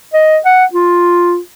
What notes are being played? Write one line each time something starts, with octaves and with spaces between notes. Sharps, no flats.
D#5
F#5
F4